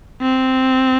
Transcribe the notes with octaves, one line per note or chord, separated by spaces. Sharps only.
C4